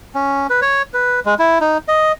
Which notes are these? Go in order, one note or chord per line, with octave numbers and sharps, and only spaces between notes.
C#4
B4
C#5
B4
G#3
E4
D#4
D#5